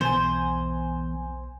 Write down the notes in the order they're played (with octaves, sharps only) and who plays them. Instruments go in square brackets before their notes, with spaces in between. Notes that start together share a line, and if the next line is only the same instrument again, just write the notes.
[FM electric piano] B1 G#5 [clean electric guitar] E2 [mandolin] C5